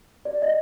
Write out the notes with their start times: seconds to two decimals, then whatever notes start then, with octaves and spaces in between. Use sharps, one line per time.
0.25 D5
0.42 D#5